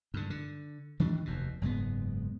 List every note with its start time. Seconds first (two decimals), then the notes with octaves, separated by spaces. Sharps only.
0.14 G2 D3
0.30 D3
1.00 D#3 E3 D4
1.25 F1 D#2 B2
1.61 F#1 G#2 G#3 B3